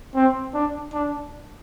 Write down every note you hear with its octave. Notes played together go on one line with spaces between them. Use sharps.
C4
D4
D4